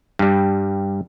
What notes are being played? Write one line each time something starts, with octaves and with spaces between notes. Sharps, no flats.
G2 G3